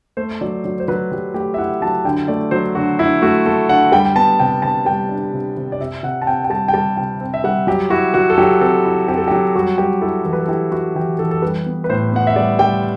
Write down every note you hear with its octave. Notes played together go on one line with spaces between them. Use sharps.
A3 C5
F#3 D5
F#3 D5
C5
F#3 B4
F#3 G4
A3 G4
E5
E4 F#5
F#3 A5
D3 G5
A3 D5
F#3 C5
D3 F#4
D3 E4
A3 F#4
A3 A4
D3 F#5
G3 G5
G5
B3 A5
C3 G5
C3 A5
G3 G5
D4
C3
C3
D5
C3 E5
C3 F#5
A5
C4 G5
G5
G3 A5
G5
G3 A5
C3 G5
C4
E5
G3 F#5
F#3 G4
E4 F#4
F#3 F#4
A4
F#3 G4
C4 A4
E4
C4 G4
A4
F#3 G4
G3 F#4
G3 G4
E4 A4
E3 A4
B4
A4
E4 G4
E4 F#4
E3 G4
E3 A4
A4
G3 B4
B3
B4
A2 C5
B3 F#5
E5
G3 D5
G3 G5